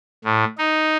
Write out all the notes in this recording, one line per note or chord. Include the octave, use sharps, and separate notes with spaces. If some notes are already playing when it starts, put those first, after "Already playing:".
A2
D#4